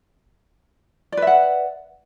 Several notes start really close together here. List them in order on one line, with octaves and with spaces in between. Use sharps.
D5 B4 E5 F#5